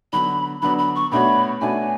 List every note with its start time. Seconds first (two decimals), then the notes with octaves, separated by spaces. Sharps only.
0.13 D3 F#3 B3 D4 B5
0.62 D3 F#3 B3 D4 B5
0.79 B5
0.95 C#6
1.12 B2 A3 D4 F#4 C#5 B5
1.61 B2 A3 D4 F#4 C#5 G#5